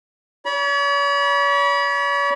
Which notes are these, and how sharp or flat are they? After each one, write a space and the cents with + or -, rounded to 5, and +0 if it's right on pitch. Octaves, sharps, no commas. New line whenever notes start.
C#5 +40 B5 -30